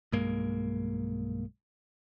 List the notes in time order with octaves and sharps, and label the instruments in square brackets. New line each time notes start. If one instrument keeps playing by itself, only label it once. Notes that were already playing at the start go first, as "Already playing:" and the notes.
[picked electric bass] B1 G2 G#3 A#3